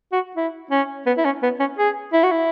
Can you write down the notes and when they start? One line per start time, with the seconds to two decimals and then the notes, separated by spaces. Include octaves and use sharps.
0.12 F#4
0.36 E4
0.71 C#4
1.06 B3
1.18 E4
1.25 C#4
1.43 B3
1.60 C#4
1.79 G#4
2.13 E4
2.23 F#4
2.31 E4